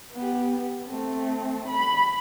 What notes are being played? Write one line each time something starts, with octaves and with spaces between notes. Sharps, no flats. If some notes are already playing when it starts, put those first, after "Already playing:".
B3 G4
A3 C4
B5